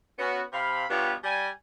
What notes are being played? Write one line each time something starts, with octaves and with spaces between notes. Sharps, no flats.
B3 C#4 F#4
C3 F5 B5
G2 B2 B3 F4 G4 C#5
G3 G#5